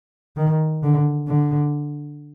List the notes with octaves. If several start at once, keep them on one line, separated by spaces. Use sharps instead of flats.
D#3
D3
D3